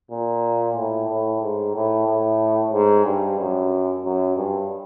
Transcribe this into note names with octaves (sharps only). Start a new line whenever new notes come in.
A#2
A2
A2
G#2
A2
A2
G#2
G2
F#2
F#2
G2